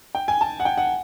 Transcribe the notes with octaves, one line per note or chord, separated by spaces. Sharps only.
G5
G#5
A5
F#5
G5
F#5